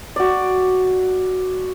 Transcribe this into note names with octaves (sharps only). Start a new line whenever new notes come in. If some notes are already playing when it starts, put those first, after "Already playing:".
F#4 D5